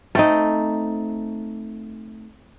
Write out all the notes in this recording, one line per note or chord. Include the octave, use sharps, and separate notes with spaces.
A3 C4 D#4